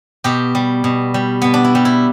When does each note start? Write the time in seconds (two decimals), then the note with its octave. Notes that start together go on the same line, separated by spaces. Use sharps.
0.24 B2 G4
0.55 G3
0.84 B2
1.14 G3
1.42 B2 B3
1.54 D4
1.64 E4
1.75 G3
1.85 E4